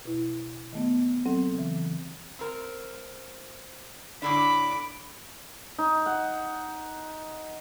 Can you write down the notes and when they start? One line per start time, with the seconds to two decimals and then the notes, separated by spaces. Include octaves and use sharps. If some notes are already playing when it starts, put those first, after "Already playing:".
0.05 B2 E4
0.73 D#3 A3 B3
1.26 F#3 C4 A4
1.54 C#3 E3
2.39 C4 A#4
4.22 A2 D3 D4 B5 D6
5.78 D#4
6.06 F#5